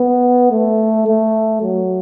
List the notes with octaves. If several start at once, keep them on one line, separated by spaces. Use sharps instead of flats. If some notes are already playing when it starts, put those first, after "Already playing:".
Already playing: B3
A3
A3
F#3